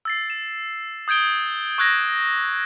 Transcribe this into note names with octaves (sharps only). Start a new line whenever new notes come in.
E6 A6 C7
E7
D#6 G6 G#6 D7 G7
C#6 E6 F#6 G#6 A#6